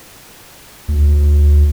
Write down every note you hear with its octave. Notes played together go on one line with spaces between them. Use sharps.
D2